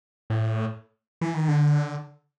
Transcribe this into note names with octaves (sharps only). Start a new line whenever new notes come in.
A2
E3
D#3
D3